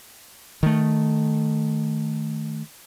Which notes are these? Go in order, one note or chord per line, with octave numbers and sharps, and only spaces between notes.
D#3 A3